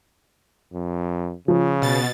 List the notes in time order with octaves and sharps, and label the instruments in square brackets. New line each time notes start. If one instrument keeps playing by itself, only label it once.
[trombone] F2
[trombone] C#3 [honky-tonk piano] F3
[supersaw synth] B2 A6